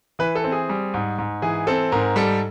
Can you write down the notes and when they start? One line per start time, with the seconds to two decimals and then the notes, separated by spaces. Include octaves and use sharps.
0.19 E3 B4
0.35 A4
0.44 C4
0.52 G#4
0.69 G3
0.94 G#2
1.18 G#2
1.42 E3 G#4
1.67 C4 A4
1.92 G#2 A#4
2.16 G3 A4